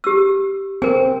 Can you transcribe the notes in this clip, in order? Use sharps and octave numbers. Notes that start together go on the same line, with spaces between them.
G4 E6
C4 A#4 G#5